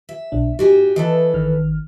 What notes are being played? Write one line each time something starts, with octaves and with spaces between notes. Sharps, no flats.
E5
B1 B2 D4
G#2 D#4 F#4 G4 G#5
E3 A4 B4 D#5 E5 A5
G#1 D#3 F6